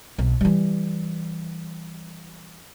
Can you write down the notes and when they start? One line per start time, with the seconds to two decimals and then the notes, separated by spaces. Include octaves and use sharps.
0.18 B1
0.41 E3 G3